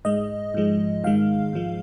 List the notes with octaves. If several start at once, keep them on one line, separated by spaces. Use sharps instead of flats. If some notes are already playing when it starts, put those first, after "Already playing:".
G#2 G#3 D#5
G#2 F3 G#3
G#2 D#3 G#3 F5
G#2 F3 G#3